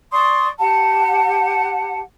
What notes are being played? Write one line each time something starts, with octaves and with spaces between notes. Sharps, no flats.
D5 C6 C#6 D#6
G4 F#5 A5